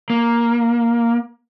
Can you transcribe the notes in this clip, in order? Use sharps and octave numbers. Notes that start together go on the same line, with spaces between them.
A#3